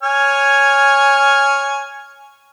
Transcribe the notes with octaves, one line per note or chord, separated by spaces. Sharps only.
C#5 G#5 F6